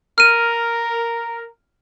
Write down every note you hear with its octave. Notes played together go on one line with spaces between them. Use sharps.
A#4 F6 D#7